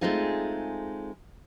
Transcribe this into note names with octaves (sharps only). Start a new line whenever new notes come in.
G#3 A3 C4 D#4 F4 G#4